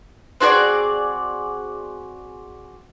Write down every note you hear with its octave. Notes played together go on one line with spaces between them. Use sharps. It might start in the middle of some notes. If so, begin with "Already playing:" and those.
C4 F#4 G#4 D5